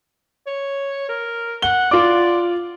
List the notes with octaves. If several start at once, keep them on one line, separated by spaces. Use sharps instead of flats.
C#5
A#4
F#5 G7
F4 D5 D6